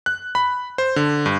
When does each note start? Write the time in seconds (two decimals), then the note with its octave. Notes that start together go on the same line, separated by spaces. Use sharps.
0.06 F#6
0.35 B5
0.78 C5
0.96 D3
1.26 G2